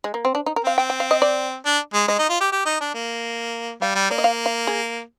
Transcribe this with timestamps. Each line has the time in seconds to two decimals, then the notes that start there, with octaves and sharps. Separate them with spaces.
0.04 G#3
0.14 A#3
0.25 C4
0.35 D4
0.46 D#4
0.56 A#4
0.64 C4 F5
0.78 C4 G5
0.90 G5
1.00 F5
1.11 D#5
1.22 D5
1.65 D4
1.94 G#3
2.08 G#3 D#5
2.19 D#4
2.29 F4
2.41 G4
2.52 G4
2.66 D#4
2.81 D4
2.94 A#3
3.81 G3 F5
3.95 G3
4.10 A#3 D5
4.18 D#5
4.24 F5
4.46 F5
4.67 G#4